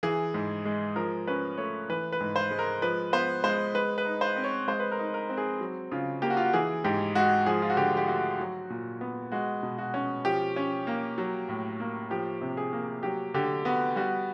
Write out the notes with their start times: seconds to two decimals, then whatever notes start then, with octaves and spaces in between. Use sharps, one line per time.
0.03 E3 G#4
0.34 G#2
0.65 G#3
0.96 F3 A#4
1.27 C#4 B4
1.58 A3 C#5
1.89 E3 B4
2.12 B4
2.20 G#2
2.36 C5
2.51 G#3
2.59 A#4
2.82 F3 B4
3.13 B3 C5
3.44 G#3 C5
3.75 G#3 B4
3.98 B4
4.05 D#4
4.21 C5
4.36 C4
4.44 C#5
4.68 G#3 C5
4.80 B4
4.91 A#4
4.99 D#4
5.14 A#4
5.29 C4
5.37 G#4
5.61 F#3
5.92 C#3 F4
6.22 A#3 G4
6.30 F#4
6.37 F4
6.45 F#4
6.53 E3 G#4
6.84 G#2 G4
7.15 G#3 F#4
7.46 F3 G#4
7.62 F4
7.70 F#4
7.77 D3 G4
7.97 G4
8.08 A3 F#4
8.40 F#3
8.70 A#2
9.01 B3
9.32 G#3 F#4
9.63 B2
9.78 F#4
9.94 C#4
10.25 F3 G4
10.56 C#4
10.87 A#3
11.18 F#3
11.49 A2
11.80 A#3
12.11 F3 G4
12.41 C3
12.57 G#4
12.73 A#3
13.03 F#3 G4
13.34 D3 G4
13.65 B3 F#4
13.96 G3 F#4